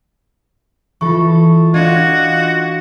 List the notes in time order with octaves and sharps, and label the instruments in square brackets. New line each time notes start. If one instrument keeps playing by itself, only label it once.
[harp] E3 [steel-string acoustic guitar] G#3 A4 [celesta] F4 C#6
[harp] D4 D#5 [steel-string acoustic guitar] F4 [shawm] F#4 [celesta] G#6